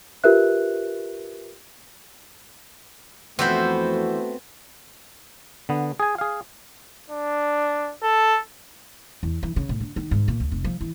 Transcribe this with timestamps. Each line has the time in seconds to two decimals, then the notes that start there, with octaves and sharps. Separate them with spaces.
0.24 F4 G4 A#4 B4 E5 F#6
3.39 F2 E3 A3 B3 C4 F#4 C5
5.69 D3 B3
6.00 G#4 G#5
6.18 G#4 F5
7.10 D4
8.03 A4
9.23 E2
9.43 E3
9.56 C#3
9.69 A2
9.80 D3
9.96 D#3
10.11 G#2
10.28 A#2
10.40 D2
10.52 F1
10.64 F3
10.81 E3